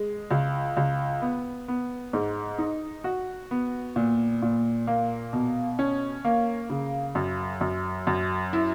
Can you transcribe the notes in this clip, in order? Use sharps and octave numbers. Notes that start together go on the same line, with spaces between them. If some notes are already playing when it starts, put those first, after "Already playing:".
Already playing: G#3
C#2
C#2
B3
B3
G#2
D#4
F#4
B3
A#2
A#2
A#3
B2
C#4
A#3
C#3
F#2
F#2
F#2
E4